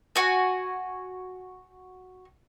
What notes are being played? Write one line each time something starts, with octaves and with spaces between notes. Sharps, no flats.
F#4 G#5